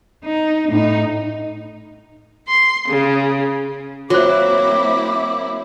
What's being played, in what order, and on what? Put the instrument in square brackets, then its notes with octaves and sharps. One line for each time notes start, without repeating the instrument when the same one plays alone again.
[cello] D#4
A2 D#4
[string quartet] C6
C#3
[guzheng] F#3 [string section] A#3 C4 E4 [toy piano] F#4 C5 [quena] D6